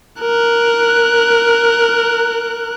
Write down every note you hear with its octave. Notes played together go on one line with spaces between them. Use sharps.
A#4 F#6